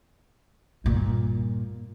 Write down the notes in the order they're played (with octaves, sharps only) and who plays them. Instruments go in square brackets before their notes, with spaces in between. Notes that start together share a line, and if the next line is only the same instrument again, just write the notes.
[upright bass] G2 A#2